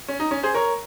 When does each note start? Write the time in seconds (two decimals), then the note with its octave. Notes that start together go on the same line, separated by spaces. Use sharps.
0.08 C#4
0.20 D#4
0.31 C#4
0.43 G#4 C5
0.54 A#4 C#5